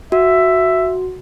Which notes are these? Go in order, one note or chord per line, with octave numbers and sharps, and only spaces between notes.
F#4 E5